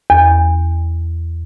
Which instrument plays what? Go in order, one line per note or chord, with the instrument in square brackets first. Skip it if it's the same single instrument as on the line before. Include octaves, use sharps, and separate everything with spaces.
[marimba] E2